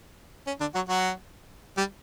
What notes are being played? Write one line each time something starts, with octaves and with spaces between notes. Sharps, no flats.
C#4
D3 D4
F#3 F#4
F#3 F#4
G3 G4